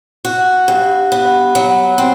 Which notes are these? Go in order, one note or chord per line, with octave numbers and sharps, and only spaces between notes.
F#4
G2
B3
F#3
C4